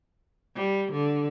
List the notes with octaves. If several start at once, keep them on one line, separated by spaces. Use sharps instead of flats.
G3
D3